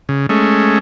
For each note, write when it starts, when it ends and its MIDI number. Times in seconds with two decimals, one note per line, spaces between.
0.09 0.26 49
0.29 0.79 56
0.29 0.79 57
0.29 0.79 61